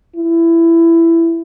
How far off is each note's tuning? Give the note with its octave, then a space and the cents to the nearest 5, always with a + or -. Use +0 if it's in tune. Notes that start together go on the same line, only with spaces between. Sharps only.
E4 +15